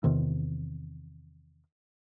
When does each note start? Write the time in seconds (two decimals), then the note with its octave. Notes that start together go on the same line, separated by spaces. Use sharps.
0.04 E2 C3 D#3